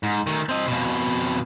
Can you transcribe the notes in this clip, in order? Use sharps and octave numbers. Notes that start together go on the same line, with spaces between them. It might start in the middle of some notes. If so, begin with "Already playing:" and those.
G#2
D#3 A3
C4 D#5
F2 B2